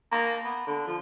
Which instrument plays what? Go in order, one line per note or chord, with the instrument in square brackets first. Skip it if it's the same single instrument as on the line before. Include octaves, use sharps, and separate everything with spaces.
[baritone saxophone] A#3
B3
D3
F3